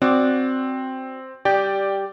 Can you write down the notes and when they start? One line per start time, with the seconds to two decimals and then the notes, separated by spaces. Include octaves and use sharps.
0.02 C4 F#4 D5
1.45 G3 G4 D5 G5